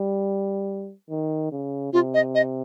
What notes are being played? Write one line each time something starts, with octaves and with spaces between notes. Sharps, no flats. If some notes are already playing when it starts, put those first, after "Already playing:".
Already playing: G3
D#3
C#3
C3 F4
D#5
D#5